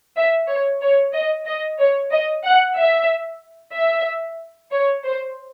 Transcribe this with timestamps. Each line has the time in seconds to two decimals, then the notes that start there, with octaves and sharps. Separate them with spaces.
0.16 E5
0.48 C#5
0.81 C#5
1.13 D#5
1.46 D#5
1.79 C#5
2.11 D#5
2.44 F#5
2.76 E5
3.74 E5
4.71 C#5
5.04 C5